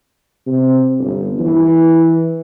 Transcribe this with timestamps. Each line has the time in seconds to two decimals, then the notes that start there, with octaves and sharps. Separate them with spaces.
0.47 C3
0.99 G1
1.39 E3